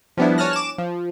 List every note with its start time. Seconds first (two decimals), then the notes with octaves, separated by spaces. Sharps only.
0.17 F3 G3 B3 D4 E4
0.38 C#5 G#5 A5 F6 F#6 A#6
0.53 D6 E7
0.78 F3